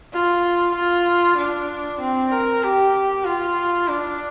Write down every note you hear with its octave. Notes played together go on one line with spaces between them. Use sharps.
F4
F4
D4
C4
A#4
G4
F4
D4